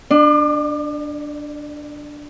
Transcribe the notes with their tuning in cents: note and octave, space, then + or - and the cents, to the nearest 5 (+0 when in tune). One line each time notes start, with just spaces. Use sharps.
D4 +0 D5 +40